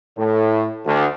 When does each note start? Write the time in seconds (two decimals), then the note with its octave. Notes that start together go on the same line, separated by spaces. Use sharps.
0.17 A2
0.85 D2